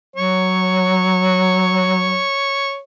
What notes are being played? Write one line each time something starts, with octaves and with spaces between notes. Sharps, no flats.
F#3 C#5